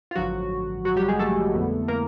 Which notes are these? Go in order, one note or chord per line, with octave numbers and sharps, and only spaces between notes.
F4
A1 G2 D3 F3 F#3 F#4
F#3 F#4
G3 G4
G#3 G#4
A3 A4
F2 D3 G3 B3 E4
A#3 A#4